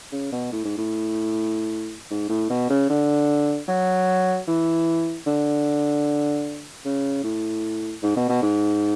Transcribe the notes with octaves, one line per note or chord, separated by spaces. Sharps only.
C#3
B2
A2
G#2
A2
G#2
A2
B2
C#3
D3
F#3
E3
D3
C#3
A2
G#2
B2
B2
G#2